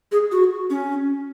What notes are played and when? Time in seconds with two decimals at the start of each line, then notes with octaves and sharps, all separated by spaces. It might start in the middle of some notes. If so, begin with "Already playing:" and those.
0.12 G#4
0.32 F#4
0.70 C#4